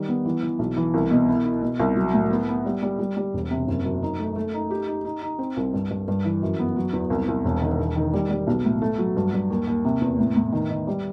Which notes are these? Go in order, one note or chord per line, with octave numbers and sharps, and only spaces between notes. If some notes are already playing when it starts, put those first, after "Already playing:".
Already playing: D#3 G3
B3
E3
E3
B1
E3
C2
B2
E4
E4
B2
C2
F#3
A2
B3
B3
G3
G3
G3
G3
E1
C3
F#1
F#2
D#4
A3
A3
D#4
G4
D#4
D#4
D#4
C4
C2
G2
G2
G2
E3
F#2
B3
F#3
E2
C2
C2
E1
D#3
E1
D#3
G3
G3
B1
A2
A3
F#3
G2
G2
D#2
D#2
C3
E2
A2
A2
D#3
D#3
G3